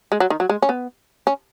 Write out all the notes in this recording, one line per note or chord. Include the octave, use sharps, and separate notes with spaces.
G#3
F#3
D#3
F#3
G#3
C#4
B3
C#4